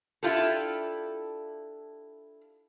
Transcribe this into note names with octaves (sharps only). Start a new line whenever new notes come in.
D4 E4 F4 G4 A4